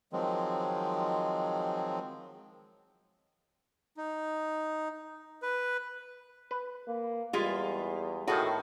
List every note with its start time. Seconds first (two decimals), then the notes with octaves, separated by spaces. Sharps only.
0.13 D#3 F3 F#3 G#3 C4
3.97 D#4
5.43 B4
6.51 B4
6.88 A#3
7.33 E2 G3 G#3 F4 B6
8.28 A2 D#3 F#4 G#4 A4